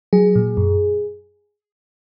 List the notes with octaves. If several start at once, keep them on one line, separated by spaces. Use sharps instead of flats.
F#3 G#4
A#2
F#2